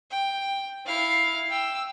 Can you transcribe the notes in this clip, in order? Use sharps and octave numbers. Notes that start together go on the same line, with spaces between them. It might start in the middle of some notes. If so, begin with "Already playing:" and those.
G5
E4 F5
G5 E6